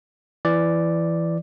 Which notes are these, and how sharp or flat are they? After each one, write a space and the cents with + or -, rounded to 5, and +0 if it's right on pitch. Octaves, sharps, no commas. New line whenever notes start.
E3 +15 D5 +0